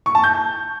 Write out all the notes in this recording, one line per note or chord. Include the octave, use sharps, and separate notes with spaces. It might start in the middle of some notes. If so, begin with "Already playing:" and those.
C#6
A5
G6